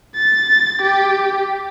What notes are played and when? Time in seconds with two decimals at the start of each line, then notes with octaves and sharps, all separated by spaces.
0.15 A6
0.82 G4